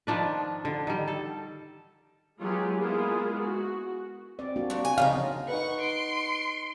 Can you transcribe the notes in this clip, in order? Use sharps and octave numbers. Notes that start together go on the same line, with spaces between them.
D#3 F3 D4 B4
D3
D#3 G3
A4
F#3 G#3 B3 F4 G4 G#4
G#3 A#3 B3 E4 F4 G#4
F#4
C4 D5
A#3 D4 F#4
G2 A#2
G#5
C#3 F3 D#4 F5
D#4 B4 F#5 C#6
C6 D7